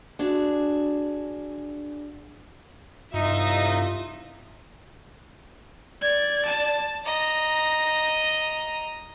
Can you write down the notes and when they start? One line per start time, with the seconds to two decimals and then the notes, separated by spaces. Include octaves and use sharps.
0.19 D4 F#4 G#4
3.14 C2 G2 D#4 F4 E5
6.02 D5 G#6
6.46 A5
7.05 D#5 A#5